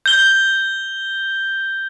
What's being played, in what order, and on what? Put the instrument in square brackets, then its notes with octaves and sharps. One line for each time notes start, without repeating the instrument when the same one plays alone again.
[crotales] G6 G7